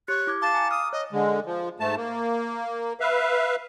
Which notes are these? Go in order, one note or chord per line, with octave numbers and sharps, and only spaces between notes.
G4 C#5 F#6
E4 D6 G#6
F5 A5 D6
G#5 A#5 D6
D#6 F6
C#5 D#5
D3 G#3
F3
G#2 A3 A5
A#3
B4 E5 F5